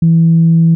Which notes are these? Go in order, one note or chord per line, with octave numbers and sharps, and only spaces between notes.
E3